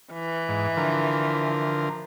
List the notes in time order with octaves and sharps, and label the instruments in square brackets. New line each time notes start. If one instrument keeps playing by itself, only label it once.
[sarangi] E3
[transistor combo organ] G#2
D3 F3 A#4